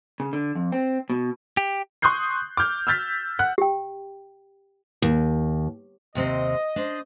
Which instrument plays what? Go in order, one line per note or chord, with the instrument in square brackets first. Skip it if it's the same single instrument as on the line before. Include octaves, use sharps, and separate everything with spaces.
[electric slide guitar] C#3
D3
F2
C4
B2
G4
[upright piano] C6 C#6 D#6 F#6 G6 C7
D6 F6 G6
E6 F6 G6 A6 B6
F#5 F#6
[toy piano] G4 G5
[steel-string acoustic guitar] D#2
[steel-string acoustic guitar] D#2 C3 C4 [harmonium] D#5
[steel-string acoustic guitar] D4 C5